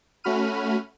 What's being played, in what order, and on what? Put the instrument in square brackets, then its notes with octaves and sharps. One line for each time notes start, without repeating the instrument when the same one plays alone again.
[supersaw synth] A3 C#4 F#4 B5 F6 D#7